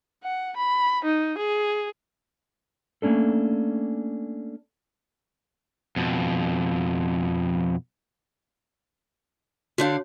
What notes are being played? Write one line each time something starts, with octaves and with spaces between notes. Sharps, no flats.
F#5
B5
D#4
G#4
A3 A#3 C#4 D4 A4
F2 B2
D3 D4 F#4 C#5 F5